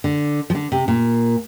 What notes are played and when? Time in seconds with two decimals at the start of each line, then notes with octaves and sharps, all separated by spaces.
0.04 D3
0.50 F3
0.55 D3
0.72 C3
0.88 A#2